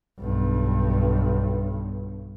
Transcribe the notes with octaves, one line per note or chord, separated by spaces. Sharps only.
B1 G2